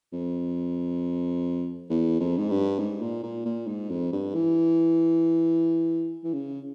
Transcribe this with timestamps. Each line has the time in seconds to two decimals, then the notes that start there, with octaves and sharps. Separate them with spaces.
0.13 F2
1.90 E2
2.20 F2
2.38 G#2
2.50 G2
2.79 G#2
3.02 A#2
3.23 A#2
3.45 A#2
3.67 G#2
3.90 F2
4.12 G2
4.35 E3
6.24 E3
6.33 C#3